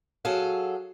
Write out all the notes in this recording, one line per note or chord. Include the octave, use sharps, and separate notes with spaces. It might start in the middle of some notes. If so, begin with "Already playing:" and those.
F#3 G#4 A4 F5